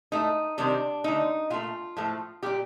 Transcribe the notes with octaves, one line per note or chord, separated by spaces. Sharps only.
A2 A3 D#4
C3 D#3 G3 D4
D3 A3 D#4
A#2 A3 F4
A2 F3 A3
A#2 G3 G4